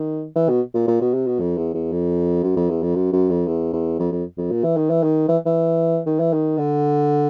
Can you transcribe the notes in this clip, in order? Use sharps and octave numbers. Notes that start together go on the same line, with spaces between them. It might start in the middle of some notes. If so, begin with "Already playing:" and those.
Already playing: D#3
E3
B2
A#2
A#2
B2
C3
B2
F2
E2
E2
F2
F#2
F2
E2
F2
F#2
F#2
F2
E2
E2
F2
F2
F2
A#2
E3
D#3
E3
D#3
E3
E3
D#3
E3
D#3
D3